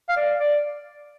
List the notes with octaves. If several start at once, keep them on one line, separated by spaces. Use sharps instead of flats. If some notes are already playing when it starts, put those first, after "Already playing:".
F5
D5
D5